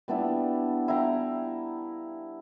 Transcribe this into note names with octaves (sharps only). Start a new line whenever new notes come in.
G3 B3 D4 E4
E4 F5 G5 A#5